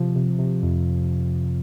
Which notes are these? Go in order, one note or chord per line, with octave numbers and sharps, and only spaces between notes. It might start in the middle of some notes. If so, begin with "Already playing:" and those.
Already playing: C3 F3
C3
C3
F2